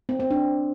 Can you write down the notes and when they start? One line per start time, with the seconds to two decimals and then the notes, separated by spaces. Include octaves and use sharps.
0.09 C4
0.20 C4
0.31 D4